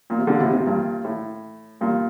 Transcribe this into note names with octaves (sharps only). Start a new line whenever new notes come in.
A#2
C3
A#2 D3
A2 C3
A2 C3
G2 A#2
A2
G2 A#2